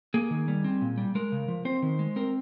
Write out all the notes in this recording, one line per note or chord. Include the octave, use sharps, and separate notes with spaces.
A#3 G#4
D#3
G3
C4
A#2
G3
G#3 A#4
C#3
F3
C4 C5
D#3
G#3
C4 A#4